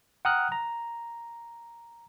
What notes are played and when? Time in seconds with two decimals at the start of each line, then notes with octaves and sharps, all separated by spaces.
0.25 F#5 G5 A#5 D#6 F6 F#6
0.52 A#5